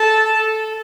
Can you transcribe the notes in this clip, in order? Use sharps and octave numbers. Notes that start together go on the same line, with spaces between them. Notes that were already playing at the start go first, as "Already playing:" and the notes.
Already playing: A4 A5
A4